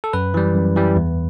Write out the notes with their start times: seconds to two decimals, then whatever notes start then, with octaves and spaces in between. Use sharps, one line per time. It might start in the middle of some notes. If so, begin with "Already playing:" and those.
0.04 A4
0.13 F#2 B4
0.34 E3 G3
0.55 F#2
0.76 E3 G3
0.96 E2